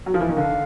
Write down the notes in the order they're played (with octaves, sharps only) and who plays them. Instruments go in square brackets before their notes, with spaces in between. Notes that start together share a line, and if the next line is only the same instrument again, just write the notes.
[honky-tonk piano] F#3
F3
E3
D#3
[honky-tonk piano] D3 [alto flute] F5